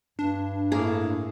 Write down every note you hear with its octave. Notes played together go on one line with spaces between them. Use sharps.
G2 D4
A2 A#3 G#4